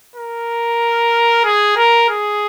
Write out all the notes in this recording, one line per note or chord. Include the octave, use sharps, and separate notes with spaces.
A#4
G#4
A#4
G#4